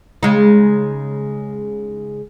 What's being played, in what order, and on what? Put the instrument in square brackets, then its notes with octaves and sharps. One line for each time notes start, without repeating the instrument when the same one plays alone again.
[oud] C#3 G#3 D#4